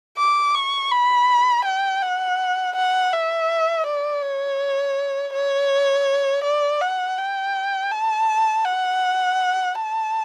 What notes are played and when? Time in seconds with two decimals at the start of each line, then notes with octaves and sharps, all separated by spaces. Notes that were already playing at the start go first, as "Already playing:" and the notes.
0.18 D6
0.55 C#6
0.92 B5
1.65 G5
2.02 F#5
2.76 F#5
3.13 E5
3.86 D5
4.23 C#5
5.33 C#5
6.44 D5
6.81 F#5
7.18 G5
7.92 A5
8.65 F#5
9.76 A5